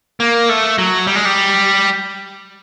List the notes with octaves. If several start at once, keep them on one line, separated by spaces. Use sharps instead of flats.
A#3
A3
F#3
G3
G#3
G3